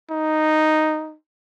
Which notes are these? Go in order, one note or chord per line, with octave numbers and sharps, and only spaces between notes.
D#4